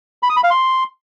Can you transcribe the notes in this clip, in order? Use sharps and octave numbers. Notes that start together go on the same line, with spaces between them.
B5
D#6
B5
F5
C6